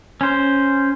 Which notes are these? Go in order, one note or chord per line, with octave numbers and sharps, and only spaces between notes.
C#4 C5